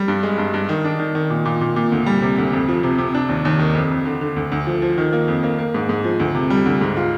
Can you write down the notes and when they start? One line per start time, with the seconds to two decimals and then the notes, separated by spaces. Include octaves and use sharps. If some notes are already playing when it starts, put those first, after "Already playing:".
Already playing: G3
0.08 G2
0.23 G#3
0.38 G2
0.54 G2
0.69 D#3
0.85 D4
1.00 D#3
1.15 D#3
1.30 A#2
1.46 A#2
1.61 A#2
1.76 A#2
1.92 D2
2.06 G3
2.22 C3
2.38 D2
2.53 F2
2.69 F3
2.83 C3
2.98 C3
3.14 D4
3.29 D#2
3.45 D#2
3.59 D#3
3.75 F2
3.91 F2
4.05 D3
4.21 D3
4.36 D2
4.52 D2
4.67 F3
4.82 F3
4.98 D#3
5.13 A#3
5.28 F2
5.43 A#3
5.59 A#3
5.74 G#2
5.89 G#2
6.04 F3
6.20 D2
6.35 C3
6.50 G3
6.66 D2
6.81 G#2
6.97 F4